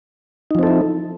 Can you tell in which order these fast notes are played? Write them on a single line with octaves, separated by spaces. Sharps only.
D#4 F3 C4 A4 E4